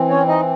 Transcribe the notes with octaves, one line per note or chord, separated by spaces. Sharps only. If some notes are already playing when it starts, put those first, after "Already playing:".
Already playing: E3 C4
C#4 C#5
D#4 D#5